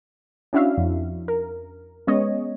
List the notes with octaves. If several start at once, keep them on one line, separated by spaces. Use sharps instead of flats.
C#4 D4 E4 F#4 E5 F5
F2
A#4
G#3 B3 C#4 C#5 D#5